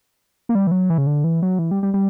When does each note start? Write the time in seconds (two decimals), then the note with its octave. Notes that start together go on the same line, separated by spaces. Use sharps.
0.49 A#3
0.55 G3
0.67 E3
0.71 F#3
0.90 E3
0.98 C#3
1.07 D3
1.24 E3
1.42 F#3
1.59 E3
1.71 G3
1.83 G3
1.94 G3